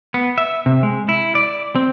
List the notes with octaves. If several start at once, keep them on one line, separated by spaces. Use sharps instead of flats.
B3
E5
C3
G#3
E4
D5
C4